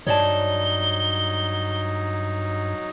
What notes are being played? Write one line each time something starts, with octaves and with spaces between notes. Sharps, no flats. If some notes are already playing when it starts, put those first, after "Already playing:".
G2 F#3 D#4 C#5 D5 A5 G7